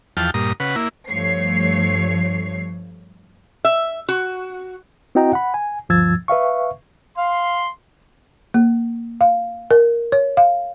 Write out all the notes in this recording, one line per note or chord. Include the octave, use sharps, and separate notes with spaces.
E2 F3 G5 A5 F6
G2 A#2 A#5 D#6
C#3 B4 F#5
A#3 E4
G2 F3 A3 C#5 C7
E5
F#4
C4 E4 F#4 D#5 G5 A#5
F#5 B5
G#5
D2 G2 F3 E6 G#6 A6
B4 E5 F5 C#6
F5 C6
A#3
F5
A#4
C#5
F5